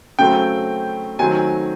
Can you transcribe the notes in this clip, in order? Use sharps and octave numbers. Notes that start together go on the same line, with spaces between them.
C#3 F#3 A3 C4 G5
D#3 F#3 A3 C4 G#5